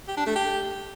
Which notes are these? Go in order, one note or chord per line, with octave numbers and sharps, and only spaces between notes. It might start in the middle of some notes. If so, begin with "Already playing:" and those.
G4
D4
A3
G4